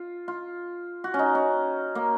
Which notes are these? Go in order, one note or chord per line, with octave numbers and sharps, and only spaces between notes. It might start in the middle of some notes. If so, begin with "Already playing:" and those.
Already playing: F4
F4
F#4
C#4
D#4
C#4
A#3